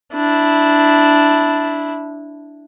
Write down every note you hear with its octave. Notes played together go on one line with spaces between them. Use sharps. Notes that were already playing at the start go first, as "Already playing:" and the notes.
D4 E4